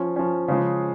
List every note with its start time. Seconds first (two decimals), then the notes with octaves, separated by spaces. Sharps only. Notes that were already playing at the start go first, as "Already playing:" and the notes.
Already playing: F3 C#4
0.16 F3 C#4
0.48 C#3 F3 G#3